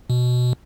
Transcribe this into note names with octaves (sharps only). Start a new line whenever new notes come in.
B2